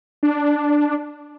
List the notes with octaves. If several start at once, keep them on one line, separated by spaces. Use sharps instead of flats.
D4